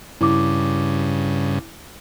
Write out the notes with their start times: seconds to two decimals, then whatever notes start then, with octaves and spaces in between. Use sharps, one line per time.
0.21 G2 C#3 E4 D6